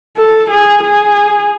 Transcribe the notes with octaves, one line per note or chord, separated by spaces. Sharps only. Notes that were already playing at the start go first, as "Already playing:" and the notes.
A4
G#4
G#4